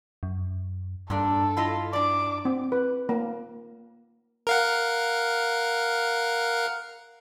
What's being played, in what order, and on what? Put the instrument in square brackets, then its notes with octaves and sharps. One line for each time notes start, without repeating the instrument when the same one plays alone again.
[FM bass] F#2
[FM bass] G2 [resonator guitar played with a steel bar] A#2 D4 [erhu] A4
[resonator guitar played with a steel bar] E4 F4 D#5
[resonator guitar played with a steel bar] D4 D5 [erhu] D6
[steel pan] C4
B4
A#3
[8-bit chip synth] A#4 F5 F#5